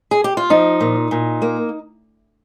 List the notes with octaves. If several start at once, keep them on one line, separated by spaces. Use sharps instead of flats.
G#4
G4
F4
F3 D#4
A#2
A#2
A#3